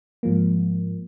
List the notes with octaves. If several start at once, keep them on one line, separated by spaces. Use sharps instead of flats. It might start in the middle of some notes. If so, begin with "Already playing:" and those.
G#2 F3 A#3